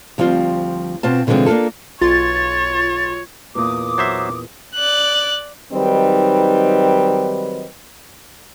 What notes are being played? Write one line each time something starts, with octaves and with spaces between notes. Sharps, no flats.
D2 F3 G3 C4 F4
B2 C4 F4 A5
B2 D3 E3 F3 G#3 C4
A#3 D4 D#4 F4 A4
B1 F4 C#5 C6 A6
E2 A#2 D6 D#6
F#3 C5 E5
D5 F#6
D#3 F#3 G3 C4 D#4 B4